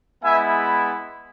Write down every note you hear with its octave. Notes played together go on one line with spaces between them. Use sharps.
G#3 B3 E4 E5 G#5